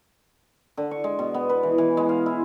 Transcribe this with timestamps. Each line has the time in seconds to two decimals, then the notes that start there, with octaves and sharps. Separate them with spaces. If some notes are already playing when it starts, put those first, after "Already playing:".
0.77 D3
0.91 C#6
1.04 G#3
1.19 B2
1.34 B3
1.49 B4
1.63 E3
1.78 E3
1.97 G#3
2.09 F5
2.26 E4